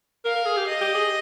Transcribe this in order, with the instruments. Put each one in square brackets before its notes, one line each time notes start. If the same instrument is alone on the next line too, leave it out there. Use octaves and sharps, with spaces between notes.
[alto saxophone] A#4 [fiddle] F5
[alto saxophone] A#4
G#4
G4
[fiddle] D#5
[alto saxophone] G4
G#4